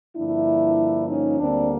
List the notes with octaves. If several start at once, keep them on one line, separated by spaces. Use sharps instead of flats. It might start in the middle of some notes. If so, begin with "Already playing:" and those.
G2 D3 F3 A#3 D4 E4
C#4 D#4
D2 D3 G3 A#3 C4 D4